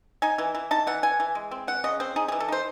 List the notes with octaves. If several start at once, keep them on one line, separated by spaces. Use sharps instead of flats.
D#4 G#5
E3
E3
D#4 A5
E3 F#5
E3 G#5
E3
G#3
C4
E3 F#5
C#3 D#5
C4 C5
D#4 G#4
G#4
E3
A4
D#4 C5